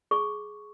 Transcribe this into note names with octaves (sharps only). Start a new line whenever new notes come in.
G#4 C#6